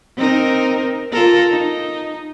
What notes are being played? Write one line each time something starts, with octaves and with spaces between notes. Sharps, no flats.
C4 D#4 A#4
F4 A4 A#4
D#4